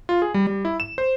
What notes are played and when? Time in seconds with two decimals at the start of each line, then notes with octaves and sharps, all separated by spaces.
0.09 F4
0.22 G#4
0.34 G3
0.47 G3
0.65 E4
0.80 E7
0.98 C5